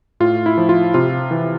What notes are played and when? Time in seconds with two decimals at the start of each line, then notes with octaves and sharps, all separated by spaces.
0.20 A2 F4
0.46 E4
0.58 F3
0.69 F4
0.94 C3 F4
1.31 E3